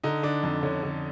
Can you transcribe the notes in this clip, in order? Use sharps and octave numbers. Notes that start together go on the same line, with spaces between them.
D3 D#4
D3 D4
F2 D4
D3 C#4
D3 C#4